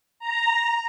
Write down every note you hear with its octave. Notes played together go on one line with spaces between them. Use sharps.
A#5